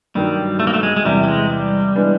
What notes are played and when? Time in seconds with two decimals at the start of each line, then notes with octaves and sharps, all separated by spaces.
0.15 G2 D#3 F#3 G3
0.60 A3
0.67 A#3
0.74 A3
0.83 G#3
0.96 G#3
1.05 E2 C3 E3 G3
1.23 G3
1.28 G#3
1.50 G3
1.95 E3 G#3 B3 D4